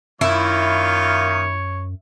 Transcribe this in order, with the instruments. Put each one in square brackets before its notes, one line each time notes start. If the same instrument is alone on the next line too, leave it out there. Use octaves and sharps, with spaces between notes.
[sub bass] F#2 [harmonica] D#3 A#3 F4 [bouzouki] E4 [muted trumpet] C#5